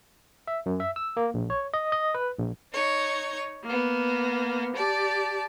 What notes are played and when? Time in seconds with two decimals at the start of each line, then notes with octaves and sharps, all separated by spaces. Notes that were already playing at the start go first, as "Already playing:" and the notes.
0.48 E5
0.66 F#2
0.80 E5
0.96 E6
1.17 A#3
1.34 A#1
1.50 C#5
1.74 D#5
1.92 D#5
2.15 B4
2.39 A#1
2.73 D#4 C#5
3.64 A#3 B3
4.75 G4 D5 A5